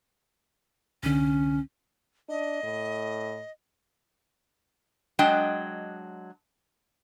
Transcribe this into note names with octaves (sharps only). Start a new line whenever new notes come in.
C2 D3 C#4
D4 D#5
A2
F#3 G#3 D4 D#5 G5